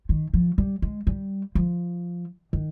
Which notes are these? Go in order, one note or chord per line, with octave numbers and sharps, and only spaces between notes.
D#3
F3
G3
G#3
G3
F3
D#3